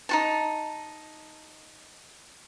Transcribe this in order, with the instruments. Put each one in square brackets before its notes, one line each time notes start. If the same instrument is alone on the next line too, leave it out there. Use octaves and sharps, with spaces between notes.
[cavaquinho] D#4 F#4 A5